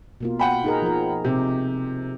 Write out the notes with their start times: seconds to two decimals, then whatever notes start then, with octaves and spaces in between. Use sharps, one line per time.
0.20 B2 A#3 F4
0.39 F#5 G5 B5
0.64 D#4 G#4 A#4
0.82 F3 A#4
1.25 C3 G4